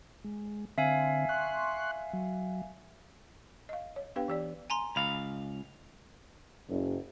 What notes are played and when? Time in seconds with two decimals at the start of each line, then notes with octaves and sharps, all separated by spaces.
0.25 G#3
0.78 D3 C4 E5 F5 G#5
1.29 C6 C#6 F#6
2.13 F#3
3.69 D#5 F5
3.96 C#5
4.16 B3 D4 G4 B4 F5 G5
4.28 E3 G4 D5
4.70 G#5 A#5 C6
4.96 C#2 F5 B5
6.68 F#1